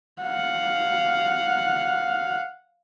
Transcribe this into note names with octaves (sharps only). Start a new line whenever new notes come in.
F5 F#5